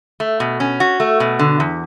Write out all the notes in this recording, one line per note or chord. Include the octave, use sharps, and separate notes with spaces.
A3
B2
C#4
F#4
A3
B2
D3
E2